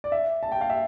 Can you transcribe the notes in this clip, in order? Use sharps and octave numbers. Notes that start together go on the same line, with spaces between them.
D5
E5
A5
G5
F5
E5